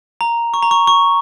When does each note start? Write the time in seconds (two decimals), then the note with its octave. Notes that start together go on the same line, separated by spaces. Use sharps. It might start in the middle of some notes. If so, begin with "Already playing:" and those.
0.21 A#5
0.54 C#6
0.63 A#5
0.71 C#6
0.87 C#6